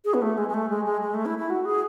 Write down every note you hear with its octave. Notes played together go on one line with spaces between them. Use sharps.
G#4
B3
A3
G#3
G#3
A3
G#3
G#3
G#3
A3
E4
E4
F#4
G#4